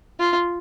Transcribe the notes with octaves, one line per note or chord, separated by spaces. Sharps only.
F4